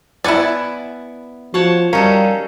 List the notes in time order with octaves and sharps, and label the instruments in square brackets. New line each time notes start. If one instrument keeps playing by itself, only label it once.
[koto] B3 F#5 G#5 [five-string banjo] E4 D5
[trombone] F3 [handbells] F#4 [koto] C#5 F#5 A5
[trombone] G3 [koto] C#4 D#4 A4 [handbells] A#4 F5 A#5